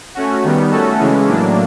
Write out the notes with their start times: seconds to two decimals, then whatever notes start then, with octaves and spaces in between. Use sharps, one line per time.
0.15 A3 C#4 F#4
0.43 D#3 G3 B3
0.71 A3 C#4 F#4 A4
0.99 C#3 E3 G#3 C#4
1.27 A2 F#3 A#3 D4